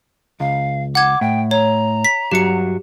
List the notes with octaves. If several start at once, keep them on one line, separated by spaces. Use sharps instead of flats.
C#2 F5
F#5 D6 G#6
A2 G5
C#5 A#5
B6
G2 F#3 F#4 G4 C#7